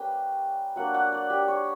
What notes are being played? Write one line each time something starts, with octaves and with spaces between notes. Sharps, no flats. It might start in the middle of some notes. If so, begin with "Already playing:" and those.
Already playing: G3 A#3 C#4 B4 G5
F#3 A#3 D4 F#5
F#5
D5
G4
C#5